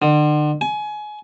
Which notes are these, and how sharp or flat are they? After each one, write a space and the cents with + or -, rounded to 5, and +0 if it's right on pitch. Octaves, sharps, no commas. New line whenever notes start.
D3 +40
G#5 +25